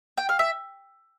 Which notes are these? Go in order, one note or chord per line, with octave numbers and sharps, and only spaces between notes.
G5
F5
E5